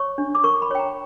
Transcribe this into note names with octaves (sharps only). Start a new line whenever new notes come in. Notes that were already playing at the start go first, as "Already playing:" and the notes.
Already playing: C#5 C#6
D4
D6
A#4 C#6
B5
C#5 G5
A#5